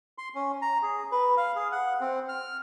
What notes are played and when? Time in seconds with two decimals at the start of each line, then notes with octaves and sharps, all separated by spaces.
0.18 C6
0.35 C#4
0.62 A#5
0.83 G#4
1.12 B4
1.37 F5
1.56 G#4
1.72 F#5
2.01 C4
2.29 F6